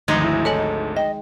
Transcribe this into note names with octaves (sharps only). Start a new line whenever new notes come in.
G#1 D2 D#3 F3 G#3 D#4
E4
A4 C#5 D#5 G#5
D#5 G5